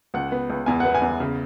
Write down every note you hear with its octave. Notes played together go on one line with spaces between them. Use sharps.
C#2 F#5
B3
C#2
E2 G#5
B3 F#5
G#5
E2
C#3